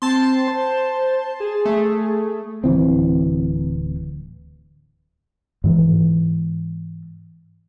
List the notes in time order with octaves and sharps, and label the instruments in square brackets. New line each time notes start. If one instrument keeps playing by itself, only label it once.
[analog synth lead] C4 [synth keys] A5 C6
[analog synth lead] C5
G#4
[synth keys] A3
[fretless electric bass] D1 E3 C4
[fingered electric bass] G#2 E3